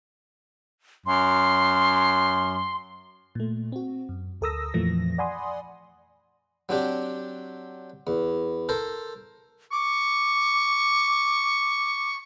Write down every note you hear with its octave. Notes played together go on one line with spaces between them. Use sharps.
F#2 C6
A#2 A3
C4 F#4
F#2
D2 A4 A#4 D#6 E6 A#6
F2 A#2 E3 F3 A3 A#6
D5 F#5 G#5 B5 C6 D#6
F#3 C4 D4 G4
E2
A4 A#4 C5
C#6 D6